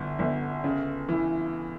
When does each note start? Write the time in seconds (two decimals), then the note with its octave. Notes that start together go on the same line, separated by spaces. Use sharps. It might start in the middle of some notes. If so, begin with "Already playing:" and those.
Already playing: G1 D3
0.19 G1
0.64 C#3
1.09 E3